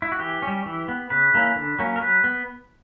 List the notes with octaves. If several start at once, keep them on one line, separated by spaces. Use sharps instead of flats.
E4
F#4
E3 G4
G3 C#4
E3
B3
C#3 B4
E3 A#3 C#4
D3
F#3 A#3 C#4
A#4
F#3 B4
B3